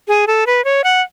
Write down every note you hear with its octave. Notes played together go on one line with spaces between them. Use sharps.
G#4
A4
B4
C#5
F#5